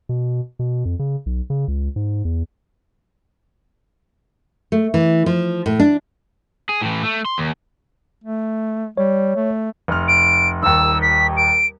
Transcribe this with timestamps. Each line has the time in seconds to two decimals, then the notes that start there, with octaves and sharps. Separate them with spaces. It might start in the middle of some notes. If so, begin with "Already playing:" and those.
0.09 B2
0.59 B2
0.85 F2
0.99 C#3
1.26 B1
1.50 C#3
1.68 C#2
1.96 G#2
2.25 E2
4.72 A3
4.94 E3
5.26 F3
5.66 A2
5.79 D4
6.69 G#4
6.81 A2 E3
7.03 A3
7.25 C6
7.38 D#2
8.24 A3
8.97 G3 C#5
9.36 A3
9.88 F1 F6
10.08 D7
10.62 D#1 D#2 E6
11.02 B6
11.37 D7